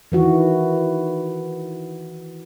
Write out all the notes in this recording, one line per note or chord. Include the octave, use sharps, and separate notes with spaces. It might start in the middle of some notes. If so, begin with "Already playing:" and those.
D#3 E3 F#4